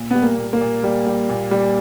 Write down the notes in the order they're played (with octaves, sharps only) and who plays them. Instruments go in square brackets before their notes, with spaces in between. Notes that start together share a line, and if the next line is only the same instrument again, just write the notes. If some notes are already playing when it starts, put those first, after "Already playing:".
Already playing: [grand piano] A#2
[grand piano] G3 [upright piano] B3
[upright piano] A#3
[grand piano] A#2
[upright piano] A#3
[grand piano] A#2
G3
G3
A#2
G3